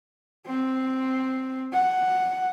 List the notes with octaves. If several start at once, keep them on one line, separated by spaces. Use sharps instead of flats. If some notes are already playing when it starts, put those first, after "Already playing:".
C4
F#5